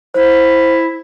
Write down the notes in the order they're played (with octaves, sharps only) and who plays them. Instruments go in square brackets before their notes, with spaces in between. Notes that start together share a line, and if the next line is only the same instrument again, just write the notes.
[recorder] E4 [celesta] C5